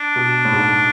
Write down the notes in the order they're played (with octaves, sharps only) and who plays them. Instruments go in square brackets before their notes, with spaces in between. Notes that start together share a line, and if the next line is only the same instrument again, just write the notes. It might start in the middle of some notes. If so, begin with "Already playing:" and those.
Already playing: [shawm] D4
[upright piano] B2
A2
G#2
A2